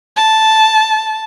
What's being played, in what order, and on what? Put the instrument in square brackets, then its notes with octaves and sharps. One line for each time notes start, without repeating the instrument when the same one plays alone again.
[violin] A5